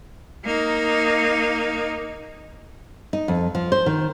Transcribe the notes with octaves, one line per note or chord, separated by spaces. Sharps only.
A#3 D#4
D#4
F2
F3
C5
D#3